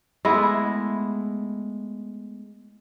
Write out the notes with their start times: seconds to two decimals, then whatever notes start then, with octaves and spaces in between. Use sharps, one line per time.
0.25 G#3 A3 B3 E4